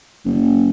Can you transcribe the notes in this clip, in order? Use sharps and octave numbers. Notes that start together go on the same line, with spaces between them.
F#1